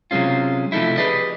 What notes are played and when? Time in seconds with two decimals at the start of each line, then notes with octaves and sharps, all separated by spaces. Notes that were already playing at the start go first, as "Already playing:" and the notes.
0.11 C3 F#3 G#3 C#4 F4
0.72 C3 F3 A3 D#4 E4
0.97 G4 G#4 B4 D5 D#5